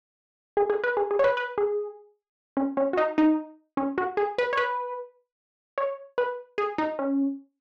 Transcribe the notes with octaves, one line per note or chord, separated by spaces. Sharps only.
G#4
G#4
B4
G#4
G#4
C#5
B4
B4
G#4
C#4
C#4
F#4
D#4
D#4
C#4
F#4
G#4
B4
C#5
B4
C#5
B4
G#4
D#4
C#4